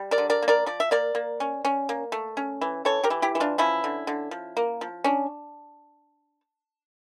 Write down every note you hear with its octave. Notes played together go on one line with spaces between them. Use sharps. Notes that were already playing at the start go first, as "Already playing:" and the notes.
Already playing: G3
A#4 D5
D3
A#4 D5
A#3
A#4 D5
F3 D5
E5
A#3 A#4 D5
A#3
C#4
C#4
A#3
A3
C#4
E3
E3 A4 C#5
G4 A#4
E3
E4 G4
E3
D4 F4
F3 C#4 E4
D3
D3
F3
A#3
F3
C#4 D4